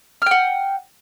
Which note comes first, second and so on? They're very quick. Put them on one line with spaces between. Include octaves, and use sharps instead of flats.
F6 G5 F#5